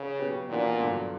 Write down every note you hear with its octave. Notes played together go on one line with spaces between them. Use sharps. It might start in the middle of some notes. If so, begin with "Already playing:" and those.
Already playing: C#3
B2 F#3 C#4 G4 B4
A#2 E3 B3 D4 F#4
G2 D3 F#3